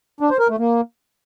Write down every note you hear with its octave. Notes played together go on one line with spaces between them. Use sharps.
D4
C5
A#4
A3
A#3